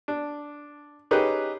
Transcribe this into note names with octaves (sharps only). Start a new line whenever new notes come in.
D4
C#4 D#4 G4 G#4 B4